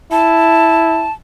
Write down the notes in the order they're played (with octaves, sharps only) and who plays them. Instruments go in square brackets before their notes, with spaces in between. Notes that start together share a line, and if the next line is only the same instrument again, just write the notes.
[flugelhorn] E4 [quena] A5